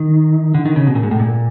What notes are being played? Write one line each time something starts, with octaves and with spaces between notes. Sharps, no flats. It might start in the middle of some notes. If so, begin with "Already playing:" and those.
Already playing: D#3
D3
D#3
C#3
B2
A#2
G#2
A2
A#2